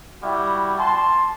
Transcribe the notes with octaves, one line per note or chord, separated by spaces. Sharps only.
G3 E4 F#4
A5 C6